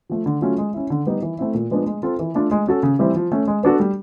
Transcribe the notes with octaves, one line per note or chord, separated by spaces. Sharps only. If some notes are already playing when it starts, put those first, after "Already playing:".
F3 A3
D3
F#3 A3 C#4 F4
G#3
C#4 E4
D3
G3 B3 D#4
E3
A3 C4 E4
A#2
F3 G#3 B3 D4
G#3
C4 F4 A4
E3
A3 D4 F4 A4
G#3
C#4 F#4 A4
C#3
E3 G3 C4 E4
F3
A3 C#4
G#3
B3 D4 F#4 A4
G3